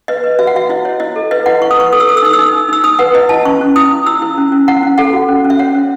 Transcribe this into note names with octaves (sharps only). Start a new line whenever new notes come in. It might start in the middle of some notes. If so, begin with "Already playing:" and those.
B4 D#5
B4
F#4 E5
F#5
F#4 E5
E4 D#5
C#5
E4 D#5
A4
B4 D#5
E4 F#5
E4 C#6
D#6
B4 C#6
A4 D#6
E6
A4 D#6
E6
D#4 D#6
E6
D#4 D#6
D#4
D#4 E6
D#4 D#6
B4 F#5
E4 D#5
E4 A5
C#4 C#6
C#4
E4 D#6
E4
E4 E6
E4
C#4
C#4
E4 F#5
C#4
A4 F#5
F#4
C#4
C#4
E5
C#5 F#5
C#4